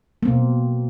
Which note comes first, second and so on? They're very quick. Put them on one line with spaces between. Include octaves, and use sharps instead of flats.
A#3 C4 B2